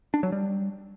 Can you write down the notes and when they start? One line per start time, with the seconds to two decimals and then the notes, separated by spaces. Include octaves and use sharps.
0.14 D4
0.23 F#3
0.32 G3